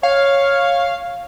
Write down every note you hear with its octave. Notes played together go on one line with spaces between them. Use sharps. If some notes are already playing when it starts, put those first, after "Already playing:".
C#5 F5